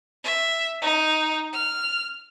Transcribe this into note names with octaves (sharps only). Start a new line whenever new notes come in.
E5
D#4
F6